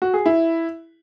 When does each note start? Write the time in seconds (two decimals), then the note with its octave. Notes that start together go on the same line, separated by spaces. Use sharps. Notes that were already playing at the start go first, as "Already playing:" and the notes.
0.02 F#4
0.14 G#4
0.26 E4